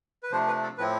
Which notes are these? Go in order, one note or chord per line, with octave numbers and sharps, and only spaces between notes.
B4
C3 F3 A3 D4 C5
B4
A4
A2 F3 C4 E4 B4